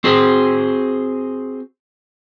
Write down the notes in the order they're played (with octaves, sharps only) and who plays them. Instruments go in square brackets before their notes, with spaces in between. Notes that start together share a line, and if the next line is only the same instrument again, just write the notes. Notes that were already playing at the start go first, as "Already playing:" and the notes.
[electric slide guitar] C4 F#4 G#4 C5